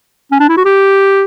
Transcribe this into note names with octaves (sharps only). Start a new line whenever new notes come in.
C#4
D4
E4
F#4
G4